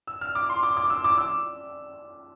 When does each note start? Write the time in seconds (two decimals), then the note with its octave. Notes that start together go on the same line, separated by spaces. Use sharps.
0.07 E6
0.21 F6
0.35 D6
0.50 C6
0.63 D6
0.77 D6
0.90 E6
1.04 D6
1.18 E6